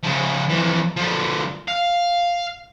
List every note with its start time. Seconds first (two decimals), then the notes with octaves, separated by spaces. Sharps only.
0.03 C#3 F3
0.49 F2 E3
0.96 D3 F3
1.68 F5